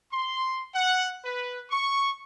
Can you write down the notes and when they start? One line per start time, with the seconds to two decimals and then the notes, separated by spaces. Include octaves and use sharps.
0.13 C6
0.75 F#5
1.25 B4
1.71 C#6